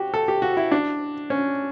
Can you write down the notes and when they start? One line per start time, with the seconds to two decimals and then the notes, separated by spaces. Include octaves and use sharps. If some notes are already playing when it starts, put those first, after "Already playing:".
Already playing: F#4 G4
0.14 A4
0.28 G4
0.42 F#4
0.57 E4
0.72 D4
1.30 C#4